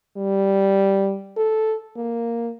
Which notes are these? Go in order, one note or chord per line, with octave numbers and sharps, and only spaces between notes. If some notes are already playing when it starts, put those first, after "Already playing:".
G3
A4
A#3